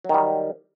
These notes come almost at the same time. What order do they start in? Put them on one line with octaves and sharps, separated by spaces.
F#3 D#3 G3